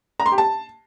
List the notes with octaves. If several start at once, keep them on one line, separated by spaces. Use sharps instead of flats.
A#5
C6
G4
A5